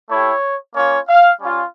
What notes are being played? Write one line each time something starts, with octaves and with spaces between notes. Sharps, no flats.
A3 E4 G4 C#5
A#3 C#4 F4 C#5
F5
G3 C#4 F4